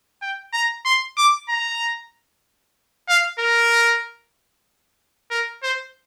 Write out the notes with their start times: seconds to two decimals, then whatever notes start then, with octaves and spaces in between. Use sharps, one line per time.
0.22 G5
0.53 A#5
0.85 C6
1.18 D6
1.49 A#5
3.09 F5
3.39 A#4
5.31 A#4
5.63 C5